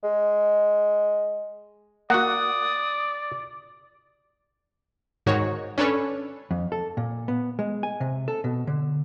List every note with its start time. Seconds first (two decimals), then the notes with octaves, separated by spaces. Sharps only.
0.03 G#3
2.10 A#3 F#4 D5 F#5 D#6
5.26 G#2 D#3 F#4 C#5
5.78 C#4 D4 A4 B4 C#5
6.51 F2
6.72 A4
6.97 A#2
7.28 B3
7.59 G#3
7.83 G#5
8.00 C3
8.28 A4
8.44 B2
8.67 D3